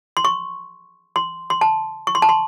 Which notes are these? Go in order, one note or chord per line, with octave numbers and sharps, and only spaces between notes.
C6
C#6
C6
C6
A5
C#6
C6
A5
C6